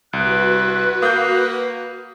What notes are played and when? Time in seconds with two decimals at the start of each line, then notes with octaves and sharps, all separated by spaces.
0.13 C2 F#4 B4 F#6
1.02 A#3 D#6 G6